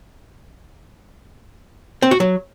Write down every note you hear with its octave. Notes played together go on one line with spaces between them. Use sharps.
C4
F#4
F#3